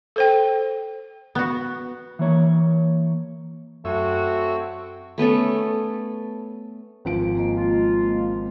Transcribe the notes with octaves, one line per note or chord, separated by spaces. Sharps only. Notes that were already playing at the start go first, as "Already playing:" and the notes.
A4 C5 G5
B3 F#4
E3 A#3 C#5
F#2 A3 C4 F#4 C#5 E6
A3 B3 C#4 A4
G#1 F3 D7
G#3 A#3 D#5
F4